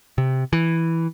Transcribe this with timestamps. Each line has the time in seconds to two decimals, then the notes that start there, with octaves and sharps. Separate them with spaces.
0.18 C3
0.53 E3